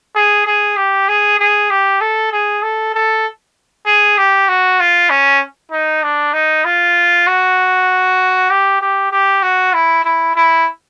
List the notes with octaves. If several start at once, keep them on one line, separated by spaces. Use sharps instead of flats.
G#4
G#4
G4
G#4
G#4
G4
A4
G#4
A4
A4
G#4
G4
F#4
F4
C#4
D#4
D4
D#4
F4
F#4
G4
G4
G4
F#4
E4
E4
E4